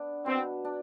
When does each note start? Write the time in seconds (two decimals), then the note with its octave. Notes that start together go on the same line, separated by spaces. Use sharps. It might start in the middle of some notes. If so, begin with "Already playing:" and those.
Already playing: B3 D4
0.25 B2 C4
0.65 D4